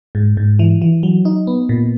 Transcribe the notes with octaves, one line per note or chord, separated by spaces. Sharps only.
G#2
G#2
E3
E3
F#3
D#4
B3
A#2